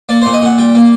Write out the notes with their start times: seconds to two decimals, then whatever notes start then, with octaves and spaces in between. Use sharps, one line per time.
0.09 A#3 D5
0.22 A#2 C5
0.33 D#5
0.42 A#2 F#5
0.58 G3 G5
0.75 A#3